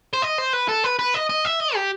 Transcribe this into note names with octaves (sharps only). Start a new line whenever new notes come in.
C5
D#5
C5
B4
A4
B4
B4
D#5
D#5
E5
D#5
G4